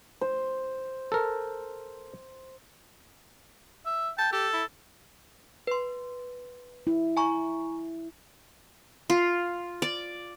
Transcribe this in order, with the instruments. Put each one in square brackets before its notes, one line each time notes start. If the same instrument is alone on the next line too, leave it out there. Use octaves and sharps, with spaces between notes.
[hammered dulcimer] C5
[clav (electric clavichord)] A4 A#4
[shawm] E5
[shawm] G5 [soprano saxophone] A5
[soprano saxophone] G4 [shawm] A4
[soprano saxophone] E4
[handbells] B4 C6
[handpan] E4
[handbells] G#5 A#5 C#6
[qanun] F4
D5